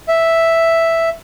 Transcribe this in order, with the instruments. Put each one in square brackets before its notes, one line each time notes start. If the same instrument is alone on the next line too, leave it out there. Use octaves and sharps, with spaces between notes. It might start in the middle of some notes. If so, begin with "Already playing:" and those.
[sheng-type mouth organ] E5